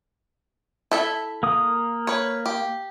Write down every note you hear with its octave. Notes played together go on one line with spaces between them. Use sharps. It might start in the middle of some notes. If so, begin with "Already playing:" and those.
E4 A4 E5
A#3 D#6
B4 C#5
G4